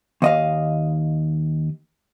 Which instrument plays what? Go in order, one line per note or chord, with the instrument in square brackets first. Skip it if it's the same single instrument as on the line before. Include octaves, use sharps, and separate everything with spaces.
[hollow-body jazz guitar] D#2 D#5 F5